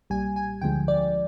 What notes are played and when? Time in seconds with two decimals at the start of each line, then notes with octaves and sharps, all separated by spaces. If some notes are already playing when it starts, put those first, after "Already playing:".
0.10 B1 A#2 G3 G#5
0.36 G#5
0.61 D2 D3 F3 G#3 G5
0.88 D5